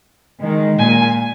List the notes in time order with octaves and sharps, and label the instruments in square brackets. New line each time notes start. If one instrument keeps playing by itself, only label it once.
[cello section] D#3 G#3
[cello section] A#2 [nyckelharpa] G#5